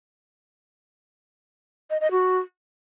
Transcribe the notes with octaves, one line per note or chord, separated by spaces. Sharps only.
D#5
D#5
F#4